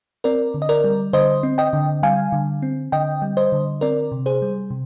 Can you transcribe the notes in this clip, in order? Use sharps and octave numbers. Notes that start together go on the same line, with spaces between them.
C4 A#4 D5
D3
D#5
A#4 D5
G3
D3 C5 D#5
C4
D#5 G5
D3
G3 F5 G#5
D3
C4
D3 D#5 G5
G3
C5 D#5
D3
C4 A#4 D5
C3
G#4 C5
G3
C3